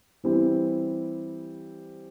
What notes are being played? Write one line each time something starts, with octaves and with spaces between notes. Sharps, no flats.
E3 G3 C4 E4